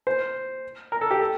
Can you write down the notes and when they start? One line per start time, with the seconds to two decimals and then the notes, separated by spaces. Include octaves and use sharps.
0.07 C5
0.92 A#4
1.01 A4
1.11 G4
1.21 A4